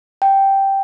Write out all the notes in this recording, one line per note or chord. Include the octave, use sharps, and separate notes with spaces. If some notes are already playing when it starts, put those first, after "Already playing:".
G5